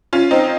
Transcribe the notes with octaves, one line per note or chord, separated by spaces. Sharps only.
C#4 F4
C4 D#4